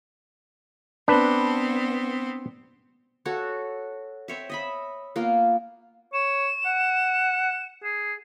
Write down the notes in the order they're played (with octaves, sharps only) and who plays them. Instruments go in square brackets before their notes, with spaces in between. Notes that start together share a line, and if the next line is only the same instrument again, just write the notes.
[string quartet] B3 C4 [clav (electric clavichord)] D4 B4
[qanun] F#4 A4 C#5
C4 C#5 E5
D#5 E5 B5
A#3 B3 F4
[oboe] C#5 [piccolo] E7
[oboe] F#5
G#4